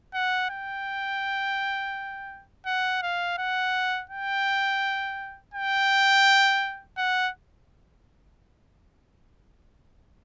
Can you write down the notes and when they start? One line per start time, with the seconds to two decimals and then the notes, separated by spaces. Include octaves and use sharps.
0.14 F#5
0.50 G5
2.66 F#5
3.02 F5
3.38 F#5
4.10 G5
5.54 G5
6.97 F#5